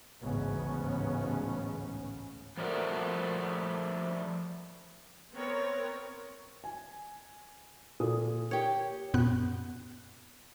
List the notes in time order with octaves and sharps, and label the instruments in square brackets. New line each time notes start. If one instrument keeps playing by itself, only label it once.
[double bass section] A1 D2 G#2 C#3 B3 C#4
[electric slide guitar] F3 G3 A3 A#4 F#5
[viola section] B3 C4 A#4 C#5
[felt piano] G#5
A#2 A4 D#6
[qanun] G4 C#5 [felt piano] A#4
[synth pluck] F#2 A#2 B3 F#6